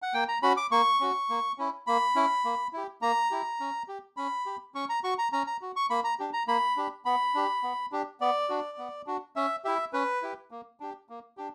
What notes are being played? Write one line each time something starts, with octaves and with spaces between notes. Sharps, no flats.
F#5
A#3 G5
A#5
C#4 F#4 B5
D6
A#3 C#6
C#4 F#4
A#3
C#4 E4
A#3 B5
C#4 E4
A#3
E4 G4
A#3 A#5
E4 G4
C#4
G4
C#4 B5
G4
C#4 C#6
A#5
F#4 C#6
A#5
C#4 A#5
A#5
F#4
C#6
A#3 B5
A#5
D4 G4
A#5
A#3 B5
D4 G4
B3 B5
D4 G4
B3
D4 G4
B3 D5
D4 F#4
B3
D4 F#4
C#4 E5
E4 G4 E5
C#4 B4
E4 G4
A#3
D4 G4
A#3
D4 G4